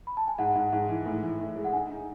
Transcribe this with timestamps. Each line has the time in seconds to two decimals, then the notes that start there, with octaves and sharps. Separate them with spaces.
0.07 B5
0.17 A5
0.28 G#5
0.38 G#2 F#5
0.55 G#2
0.73 G#2
0.89 E3
1.06 A2
1.23 E3
1.40 A2
1.56 G#3
1.64 F#5
1.73 D#4 G#5
1.90 D#4